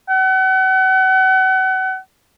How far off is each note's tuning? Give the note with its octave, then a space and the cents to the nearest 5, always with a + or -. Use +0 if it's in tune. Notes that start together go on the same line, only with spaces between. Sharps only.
F#5 +35